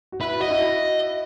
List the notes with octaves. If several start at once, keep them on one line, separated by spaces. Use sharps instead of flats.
F#4
E4 B4
F#4 D#5
E4